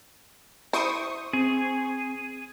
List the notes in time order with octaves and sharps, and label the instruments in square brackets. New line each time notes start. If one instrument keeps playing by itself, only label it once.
[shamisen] E4 [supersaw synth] C5 C#6 D#6
[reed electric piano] C4 [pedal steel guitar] G#4